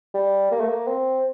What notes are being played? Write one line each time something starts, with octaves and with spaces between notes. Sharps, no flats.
G3
A#3
A3
A#3
C4